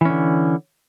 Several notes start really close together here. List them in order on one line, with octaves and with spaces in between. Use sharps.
E3 C#4 D3